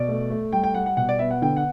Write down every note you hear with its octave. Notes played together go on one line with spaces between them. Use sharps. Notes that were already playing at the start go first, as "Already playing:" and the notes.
Already playing: B2 D5
A3
A3
G3 G5
G5
G3 F#5
F#5
B2 F#5
D5
B3 E5
F#5
D3 G5
F#5